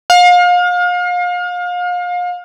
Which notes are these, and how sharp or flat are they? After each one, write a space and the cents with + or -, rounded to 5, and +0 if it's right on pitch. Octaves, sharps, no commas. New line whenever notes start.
F5 +35